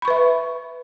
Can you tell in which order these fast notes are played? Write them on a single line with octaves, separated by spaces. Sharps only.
B5 C#6 B4 E5